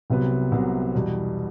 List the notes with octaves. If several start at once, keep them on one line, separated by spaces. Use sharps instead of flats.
C2 C3 F#3 B3
C2 C3 F#3 B3
E2 B2 G3